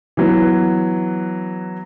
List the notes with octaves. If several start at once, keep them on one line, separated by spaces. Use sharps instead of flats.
E3 F#3 B3